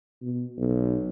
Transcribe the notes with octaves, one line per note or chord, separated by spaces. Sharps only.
B2
B1